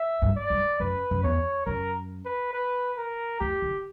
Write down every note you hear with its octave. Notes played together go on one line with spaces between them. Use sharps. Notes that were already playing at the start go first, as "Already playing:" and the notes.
Already playing: E5
G2
D5
G2
F#2 B4
F#2
E2 C#5
F#2 A#4
B4
B4
A#4
E2 G4
D3